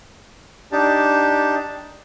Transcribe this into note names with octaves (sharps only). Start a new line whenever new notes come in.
D4 D#4 G4 A5